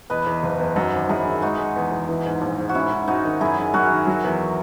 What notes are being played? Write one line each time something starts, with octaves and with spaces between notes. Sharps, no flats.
E2 B4 D#5
E2
F#1
E2
F#2 D#4 F#4
G#1
F#2 E4 G#4
D#3
G#3 D#4 F#4
G#3
E2
E2
E3
G#2
A#1
G#2
F#4
G#2 C#4 E4
G#2
G#2 D#4 F#4
D#3
F#2 E4 G#4
D#3
F#2 F#4 A#4
D#3
F#3
E2